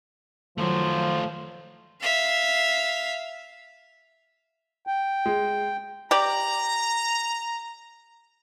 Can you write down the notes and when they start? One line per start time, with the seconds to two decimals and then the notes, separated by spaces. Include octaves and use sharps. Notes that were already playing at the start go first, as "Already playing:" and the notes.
0.58 D#3 F3 F#3 A3 F4
2.01 E5 F5
4.87 G5
5.26 G#3
6.11 G4 D5 A#5